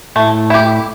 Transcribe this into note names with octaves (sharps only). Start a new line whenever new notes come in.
A2 A3
E4 G4